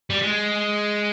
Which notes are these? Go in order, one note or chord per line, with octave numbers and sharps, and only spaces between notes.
G3
G#3